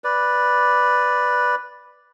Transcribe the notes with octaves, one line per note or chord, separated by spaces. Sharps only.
B4 D5